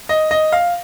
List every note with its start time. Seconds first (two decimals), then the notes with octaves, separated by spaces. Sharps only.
0.09 D#5
0.31 D#5
0.52 F5